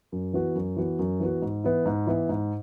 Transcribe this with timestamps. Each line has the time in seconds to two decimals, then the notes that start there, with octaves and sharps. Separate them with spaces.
0.12 F#2
0.33 E3 B3 F#4
0.55 F#2
0.77 E3 B3 F#4
0.99 F#2
1.20 E3 B3 F#4
1.42 G#2
1.64 E3 B3 E4
1.86 G#2
2.07 E3 B3 E4
2.29 G#2